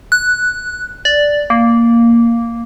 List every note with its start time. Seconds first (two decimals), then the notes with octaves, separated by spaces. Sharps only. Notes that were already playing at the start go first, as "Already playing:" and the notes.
0.12 F#6
1.05 D5
1.50 A#3